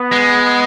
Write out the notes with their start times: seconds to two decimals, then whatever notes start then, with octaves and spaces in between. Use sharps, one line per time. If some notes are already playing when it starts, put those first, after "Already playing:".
Already playing: B3
0.12 G#3